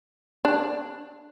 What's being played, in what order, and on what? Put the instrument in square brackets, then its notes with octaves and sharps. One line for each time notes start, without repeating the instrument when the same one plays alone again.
[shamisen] D4